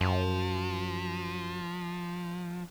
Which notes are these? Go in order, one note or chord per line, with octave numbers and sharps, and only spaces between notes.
F#2 F3